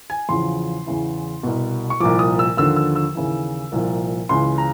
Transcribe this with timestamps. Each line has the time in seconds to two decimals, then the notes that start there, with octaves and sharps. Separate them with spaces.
0.10 G#5
0.29 E2 C#3 F3 C6
0.86 E2 C#3 E3
1.43 C2 B2
1.90 C#6
2.00 C2 A#2 F3 D6
2.19 D#6
2.39 E6
2.57 D#2 D3 F3 E6
2.76 E6
2.96 E6
3.15 D#2 C#3 E3
3.72 C2 A#2 F3
4.29 C#2 C#3 E3 C6
4.58 A#5